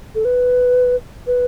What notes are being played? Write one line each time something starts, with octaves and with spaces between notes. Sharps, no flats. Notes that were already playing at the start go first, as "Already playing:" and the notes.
A4
B4
B4